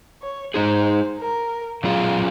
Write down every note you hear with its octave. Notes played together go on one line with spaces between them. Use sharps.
C#5
G#3 D#4 G#4 C5
A#4
F#3 C#4 F4 G#4 F5